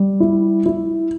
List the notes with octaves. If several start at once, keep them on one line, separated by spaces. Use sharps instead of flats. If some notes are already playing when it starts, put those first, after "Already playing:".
Already playing: G3
E4
E4